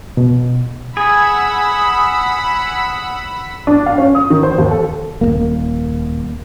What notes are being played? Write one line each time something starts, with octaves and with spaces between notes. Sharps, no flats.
B2
G#4 F#5 B5 E6
D4
F5
C#4
D#6
D#3
C5
D#2
A4
D#1 C#2 A#3